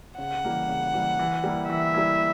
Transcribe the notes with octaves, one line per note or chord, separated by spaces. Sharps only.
C#3 F#5
E3 G3 A#3
C#3
E3 G3 A#3
E3
G3 A#3 E4
E3 E5
G3 A#3 E4